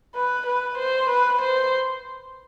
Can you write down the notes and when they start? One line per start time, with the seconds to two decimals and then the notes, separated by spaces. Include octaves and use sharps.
0.15 B4
0.46 B4
0.78 C5
1.10 B4
1.42 C5